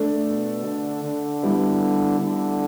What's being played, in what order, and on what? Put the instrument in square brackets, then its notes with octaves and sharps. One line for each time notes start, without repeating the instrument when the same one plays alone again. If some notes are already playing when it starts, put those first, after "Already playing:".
Already playing: [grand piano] A3 D4 A4
[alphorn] B2
D3
D3
[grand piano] G3 B3 E4 G4
[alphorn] D3